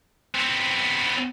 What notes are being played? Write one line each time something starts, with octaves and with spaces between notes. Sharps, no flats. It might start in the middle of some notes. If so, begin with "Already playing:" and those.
B3 C4